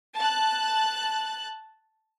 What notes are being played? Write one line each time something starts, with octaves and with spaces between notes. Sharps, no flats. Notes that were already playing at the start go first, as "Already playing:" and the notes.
A5 F#6